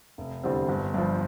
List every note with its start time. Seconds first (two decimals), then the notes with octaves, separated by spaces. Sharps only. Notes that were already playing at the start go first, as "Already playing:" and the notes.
0.18 F1
0.43 E2 D3 G3 C4
0.69 G1
0.94 G2 F3